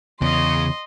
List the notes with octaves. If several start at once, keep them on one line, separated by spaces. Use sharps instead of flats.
E2 C#3 D#5 C6